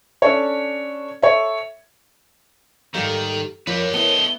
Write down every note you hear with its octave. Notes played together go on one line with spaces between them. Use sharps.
C#4 D4 A4 C#5
A4 C#5 E5
G#2 D#3 G3 G4 A4 F5
F2 F4 G4 A#4 B4 C#5
A3 B3 E4 D#5 G7